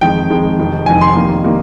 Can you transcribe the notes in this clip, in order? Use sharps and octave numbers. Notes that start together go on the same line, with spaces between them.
F2 D#3 G#3 G5
F2 D#3 G#3
F1 F2 D#3
F1 F2 D#3 G#5
C6
F2 D#3 G3 A#3
D#3 G3 A#3